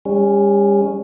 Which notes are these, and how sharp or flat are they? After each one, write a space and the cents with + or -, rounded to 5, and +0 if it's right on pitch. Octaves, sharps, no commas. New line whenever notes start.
G3 +40 C#4 +0